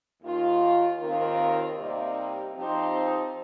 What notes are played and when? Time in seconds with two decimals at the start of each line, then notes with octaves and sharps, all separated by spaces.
0.22 D#2 D#3 A#3 F4
0.99 D#2 D#3 C4 F4 A#4
1.77 C3 G3 A#3 D#4 G4
2.55 F3 C4 D#4 G4 C5